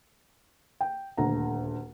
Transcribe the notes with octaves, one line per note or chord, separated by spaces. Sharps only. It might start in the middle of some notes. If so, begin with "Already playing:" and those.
G5
D#1 D2 A#5